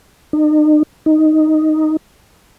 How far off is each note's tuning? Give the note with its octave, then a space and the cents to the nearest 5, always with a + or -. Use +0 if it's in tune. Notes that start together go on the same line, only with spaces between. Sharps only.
D#4 -40
D#4 +0